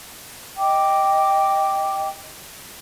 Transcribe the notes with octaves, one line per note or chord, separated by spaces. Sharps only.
D#5 G5 D6